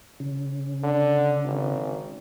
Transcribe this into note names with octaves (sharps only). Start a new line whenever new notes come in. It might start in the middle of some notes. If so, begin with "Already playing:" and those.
C#3
D3
G#1